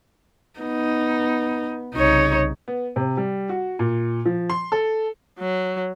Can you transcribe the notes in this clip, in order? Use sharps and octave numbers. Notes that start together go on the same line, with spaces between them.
B3 D#4
C2 C#3 D#4 C#5
B3
C3
G3
F#4
A#2
F3
C6
A4
F#3